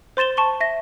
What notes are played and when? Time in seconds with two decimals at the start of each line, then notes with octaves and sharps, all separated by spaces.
0.17 C5 C6 A6 E7 G7
0.37 A5 C#6 G7
0.60 E5 A#6